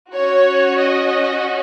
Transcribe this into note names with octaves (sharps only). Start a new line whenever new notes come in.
C#4 F#4 C#5
D#5